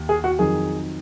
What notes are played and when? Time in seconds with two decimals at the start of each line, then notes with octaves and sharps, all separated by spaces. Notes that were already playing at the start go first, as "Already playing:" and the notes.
Already playing: D#2
0.09 G#4
0.24 F#4
0.39 F2 D#3 F#3 G#4